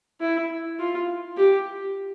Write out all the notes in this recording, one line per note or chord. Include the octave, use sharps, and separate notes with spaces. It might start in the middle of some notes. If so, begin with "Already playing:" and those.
E4
F4
G4